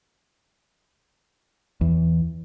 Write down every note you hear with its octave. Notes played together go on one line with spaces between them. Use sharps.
E2